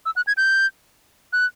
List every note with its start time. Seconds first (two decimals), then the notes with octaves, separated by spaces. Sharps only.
0.06 E6
0.16 F#6
0.27 G#6
0.37 G6
1.33 F#6